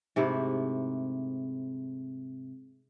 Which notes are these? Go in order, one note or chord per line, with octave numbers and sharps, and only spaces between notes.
G#2 C3 A3 E4